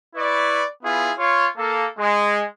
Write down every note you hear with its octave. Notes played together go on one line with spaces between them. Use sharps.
E4 B4 D5 C#6
B3 E4 F4 G#4
F4 C#5
A#3 A4
G#3